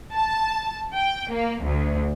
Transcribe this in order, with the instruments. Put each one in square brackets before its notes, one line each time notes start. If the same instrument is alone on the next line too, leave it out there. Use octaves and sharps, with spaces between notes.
[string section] A5
G5
A#3
D2